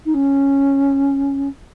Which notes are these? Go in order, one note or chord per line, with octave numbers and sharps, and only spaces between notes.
D#4
C#4